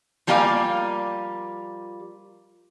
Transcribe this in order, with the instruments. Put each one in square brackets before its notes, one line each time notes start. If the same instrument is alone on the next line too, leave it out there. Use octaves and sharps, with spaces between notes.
[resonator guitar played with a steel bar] F3 G3 A#3 D5 F5 G#5